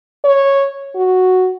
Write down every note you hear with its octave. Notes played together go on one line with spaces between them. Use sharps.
C#5
F#4